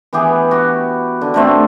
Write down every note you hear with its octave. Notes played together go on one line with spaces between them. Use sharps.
E3 B3 G4 G#4
F#4 G4
D3
D3 A3 C4